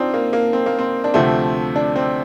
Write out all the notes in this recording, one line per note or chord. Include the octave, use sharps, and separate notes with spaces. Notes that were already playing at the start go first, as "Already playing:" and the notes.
Already playing: C4 D4 D#4 F4
A#3
A#3
C4
A#3
C4
D4
D2 C3 F3 A3 C4
D4
C4